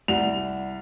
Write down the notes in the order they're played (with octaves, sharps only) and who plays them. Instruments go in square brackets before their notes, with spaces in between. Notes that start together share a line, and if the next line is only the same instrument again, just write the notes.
[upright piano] C2 F7 [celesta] D5 F#5